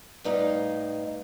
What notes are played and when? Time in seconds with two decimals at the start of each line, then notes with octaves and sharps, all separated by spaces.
0.24 A2 G3 D#4 B4 D#5 F5